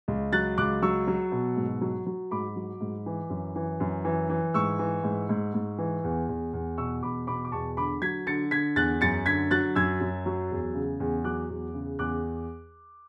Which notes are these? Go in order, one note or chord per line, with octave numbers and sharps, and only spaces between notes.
C#2
F#3 F#6 A6
C#2 D6 F#6
F#3 C#6 E6
F#3
B2
G#2
F#3
F#3
G#2 B5 D6
F#3
G#2
E3
F#2
E3
F#2
E3
E3
G#2 C#6 E6
E3
G#2
G#2
G#2
E3
E2
E2
E2
B2 C#6 E6
E2 B5 D6
B2 B5 D6
D6
E2 A5 C#6
D3 B5 D6
F#3 G#6 B6
D3 A6 C#7
D3 G#6 B6
E2 F#6 A6
F#2 A6 C#7
D3 G#6 B6
F#3 F#6 A6
F#2 E6 G#6
F#2
F#3
E2
C#3
E2
F#3 D6 F#6
E2
C#3
E2 D6 F#6